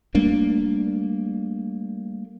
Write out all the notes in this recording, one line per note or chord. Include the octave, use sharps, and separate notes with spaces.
G3 A3 A#3 D4